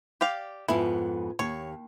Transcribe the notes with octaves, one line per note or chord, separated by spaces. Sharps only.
G4 D5 F5
F2 G#2 B3 E4
D#2 C#5